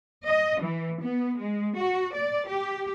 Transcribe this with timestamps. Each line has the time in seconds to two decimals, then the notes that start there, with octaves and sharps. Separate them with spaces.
0.25 D#5
0.61 E3
1.01 B3
1.39 G#3
1.76 F#4
2.15 D5
2.49 G4